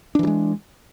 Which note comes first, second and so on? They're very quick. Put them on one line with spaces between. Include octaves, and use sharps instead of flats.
D4 E3 F#3 G#3